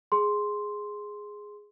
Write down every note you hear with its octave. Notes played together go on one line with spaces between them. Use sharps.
G#4 C6